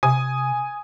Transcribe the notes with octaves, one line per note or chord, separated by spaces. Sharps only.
C3 G#5 D#6